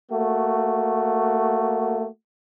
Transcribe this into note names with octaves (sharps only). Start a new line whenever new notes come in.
A3 A#3 F#4